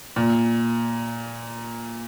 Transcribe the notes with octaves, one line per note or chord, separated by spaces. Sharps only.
A#2